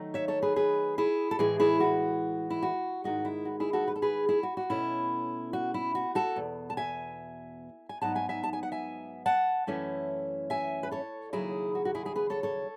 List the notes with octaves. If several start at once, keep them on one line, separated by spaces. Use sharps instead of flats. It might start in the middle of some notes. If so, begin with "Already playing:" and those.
Already playing: D#3 F#3 A3 D#4
C#5 E5
A4 C#5
G#4 B4
G#4 B4
E4 G#4
A4
A2 E3 G#3 E4 G#4
E4 G#4
F#4
E4
F#4
G#2 D#3 G#3 F#4
E4
F#4
E4 G#4
F#4 A4
B4
A4
G#4 B4
E4 G#4
F#4
F#4
B2 A3 C#4 E4
F#4
E4
F#4
F#4 A4
E2 B2
A5
E5 G#5
G#5
G#2 F#3 B3 D#4 F#5 A5
E5 G#5
E5 G#5
A5
G#5
F#5
E5 G#5
F#5 A5
F#2 E3 A3 C#4 E4
E5 G#5
B4
A4 C#5
D#2 C#3 F#3 E4 G#4
F#4
F#4
E4 G#4
E4 G#4
G#4 B4
A4 C#5
A4 C#5